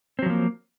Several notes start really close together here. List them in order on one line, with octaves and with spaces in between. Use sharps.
C4 F#3 F3 A#3